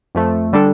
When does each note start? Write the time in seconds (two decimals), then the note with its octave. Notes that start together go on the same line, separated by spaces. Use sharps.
0.15 F2 F3 A3
0.53 D3 G3 D4 A4